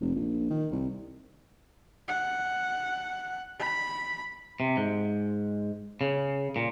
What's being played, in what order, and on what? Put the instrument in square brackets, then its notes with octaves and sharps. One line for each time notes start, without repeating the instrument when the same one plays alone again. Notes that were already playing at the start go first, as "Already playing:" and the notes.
[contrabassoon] F1
A#1
D#3
C2
[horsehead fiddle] F#5
B5
[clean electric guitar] C3
G#2
C#3
A#2